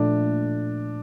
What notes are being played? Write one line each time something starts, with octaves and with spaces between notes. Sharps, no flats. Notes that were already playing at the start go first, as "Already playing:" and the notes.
Already playing: A#2 F3 A3 D4